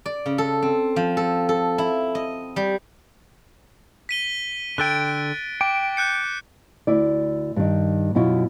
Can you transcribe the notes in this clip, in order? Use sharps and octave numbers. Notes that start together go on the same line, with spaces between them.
D5
C#3
A4
C4
F3
A4
A4
E4
D#5
G3
B6 D#7 G7
D3 A4 G5 F#6 A6 D7
G5 D6
F#6 G6 C#7
D2 E4 D5
G2 D#3
F#2 B2 E4 F4